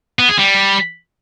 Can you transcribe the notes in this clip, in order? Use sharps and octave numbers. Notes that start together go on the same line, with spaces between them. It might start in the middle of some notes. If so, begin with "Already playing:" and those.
B3
G#4
G3